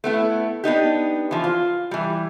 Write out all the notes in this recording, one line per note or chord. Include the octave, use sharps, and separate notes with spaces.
A3 B3 E4
B3 D4 D#4 G4
E3 F3
F4
E3 G3